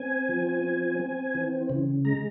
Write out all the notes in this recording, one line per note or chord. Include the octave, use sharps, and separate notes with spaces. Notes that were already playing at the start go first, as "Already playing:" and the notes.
Already playing: C4 G#5
F3
C4
C4
E3
C#3
G#3 A#5